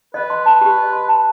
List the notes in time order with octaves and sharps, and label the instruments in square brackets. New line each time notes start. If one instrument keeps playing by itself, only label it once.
[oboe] B4 [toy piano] D#5
[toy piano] C6
A5
G4
D#5
C6
A5